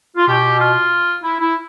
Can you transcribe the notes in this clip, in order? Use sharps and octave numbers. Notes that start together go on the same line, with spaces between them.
F4
B2 G4
F4
E4
E4